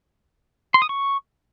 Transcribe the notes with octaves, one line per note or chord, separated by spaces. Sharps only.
C6
D#6
C#6